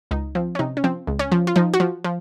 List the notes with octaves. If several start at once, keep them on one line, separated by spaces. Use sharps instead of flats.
C#2 D#4
F3 C4
C#4
C3 D#4
C#4
F3 C4
C#2
C#4
F3
F4
F3 D#4
F#4
F3
F3